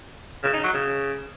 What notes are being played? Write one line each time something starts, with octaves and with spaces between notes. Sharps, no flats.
C#3
D#4
F#3
C#3